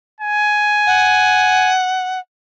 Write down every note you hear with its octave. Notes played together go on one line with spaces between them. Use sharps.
G#5
F#5